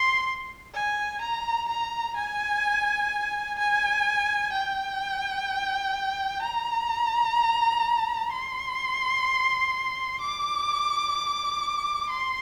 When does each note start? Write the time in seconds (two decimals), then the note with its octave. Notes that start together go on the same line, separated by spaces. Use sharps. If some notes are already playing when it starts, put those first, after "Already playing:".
Already playing: C6
0.74 G#5
1.21 A#5
1.68 A#5
2.16 G#5
3.59 G#5
4.52 G5
6.42 A#5
8.31 C6
10.20 D6
12.09 C6